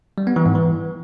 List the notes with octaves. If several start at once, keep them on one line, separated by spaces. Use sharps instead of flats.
G3
B3
E3
G#2
E3